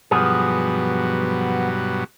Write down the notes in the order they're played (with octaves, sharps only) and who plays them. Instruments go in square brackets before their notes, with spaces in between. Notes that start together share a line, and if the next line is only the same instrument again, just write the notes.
[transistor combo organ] G2 B2 F#3 [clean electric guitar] F3 B3 G#4